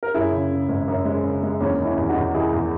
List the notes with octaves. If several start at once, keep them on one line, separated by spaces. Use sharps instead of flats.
A#4
F#2 E4 G#4
C#3
C#3
G#1
F#2
G#3
C#3
G#3
E2 A#3 C#4
D#3
C#4 E4
E2
D#4 F#4
E2
D#3 E4 G#4
E2